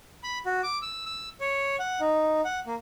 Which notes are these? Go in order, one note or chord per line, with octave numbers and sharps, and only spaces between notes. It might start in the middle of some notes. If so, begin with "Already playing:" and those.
B5
F#4
D6
E6
E6
C#5
F#5
D#4
F#5
A#3